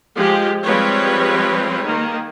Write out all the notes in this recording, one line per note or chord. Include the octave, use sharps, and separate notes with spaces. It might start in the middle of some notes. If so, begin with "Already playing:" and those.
F3 G#3 G4
F3 G3 G#3 C4 B4 C#5
D#3 A#3